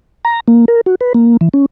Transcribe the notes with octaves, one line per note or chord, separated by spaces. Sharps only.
A#5
A#3
A#4
F#4
B4
A#3
E3
C#4